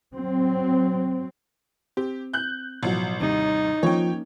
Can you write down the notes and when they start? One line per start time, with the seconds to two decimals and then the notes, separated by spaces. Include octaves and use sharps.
0.14 F#3 C4
1.97 C4 G4
2.33 F#6 G6
2.83 A1 B2 F3 F#3
3.20 D#2 C3 G3 D#4
3.83 F3 A#3 C#4 C#5 G5